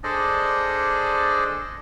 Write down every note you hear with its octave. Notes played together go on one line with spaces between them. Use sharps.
D4 G#4 A4 C5 D5 D#5